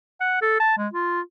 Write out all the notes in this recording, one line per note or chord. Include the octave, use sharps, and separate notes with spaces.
F#5
A4
A5
G#3
F4